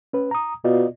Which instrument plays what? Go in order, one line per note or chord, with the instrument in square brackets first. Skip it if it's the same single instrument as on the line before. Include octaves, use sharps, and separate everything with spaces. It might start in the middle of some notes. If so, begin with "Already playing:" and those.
[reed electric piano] C#4 B4
A#5 D#6
[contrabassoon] B2 [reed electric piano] F4 D5 D#5